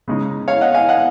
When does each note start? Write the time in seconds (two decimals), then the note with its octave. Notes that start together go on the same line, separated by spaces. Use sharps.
0.08 C#3 G#3 D#4
0.48 C#5 F5
0.61 D#5 F#5
0.74 F5 G#5
0.88 D#5 F#5